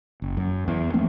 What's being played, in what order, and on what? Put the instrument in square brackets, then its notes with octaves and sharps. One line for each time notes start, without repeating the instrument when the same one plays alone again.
[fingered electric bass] F#1
F#2
E2
F3 A3 A#3 C4